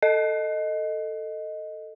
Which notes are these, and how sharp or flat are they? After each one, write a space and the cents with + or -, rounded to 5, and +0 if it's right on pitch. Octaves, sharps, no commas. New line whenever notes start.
A4 +15 D#5 +0